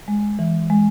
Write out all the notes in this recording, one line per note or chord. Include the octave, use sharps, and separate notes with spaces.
G#3
E3
G#3